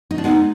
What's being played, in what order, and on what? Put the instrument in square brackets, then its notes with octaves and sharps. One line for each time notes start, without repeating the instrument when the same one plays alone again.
[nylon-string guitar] D#4
D4
[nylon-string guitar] G#3 B3 [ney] D#4